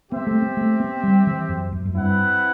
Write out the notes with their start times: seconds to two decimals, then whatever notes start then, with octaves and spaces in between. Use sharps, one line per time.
0.11 B3 C4 G4 C5 E5
0.27 A3
0.42 B3
0.57 A3
0.80 B3
1.03 G3
1.27 E3
1.49 F#2
1.72 F#2
1.86 F#2
1.95 G2 C4 E4 B4 F#5